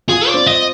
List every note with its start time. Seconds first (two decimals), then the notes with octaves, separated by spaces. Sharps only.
0.09 F4 G#4
0.28 D5
0.34 C4
0.46 D#5